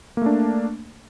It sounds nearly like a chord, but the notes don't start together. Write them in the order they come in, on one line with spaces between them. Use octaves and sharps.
A#3 A3 D4